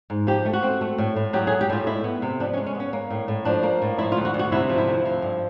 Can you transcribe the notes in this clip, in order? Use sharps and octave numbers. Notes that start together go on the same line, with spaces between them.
G#2
F3 G4
A3
F#4
C4
A3
A2
A2
F#3 G4
G#4
A3
G4
A2 F4
G#3 E4
B3
C3
F3 D4
C#4
G#3
C#4
B3
C#4
A#3
A2
A2
F3 D4
A#3
A2
F3 E4
F4
D2
F#4
D2
F#4
C3 E4
F3
E4
D2
F3
G2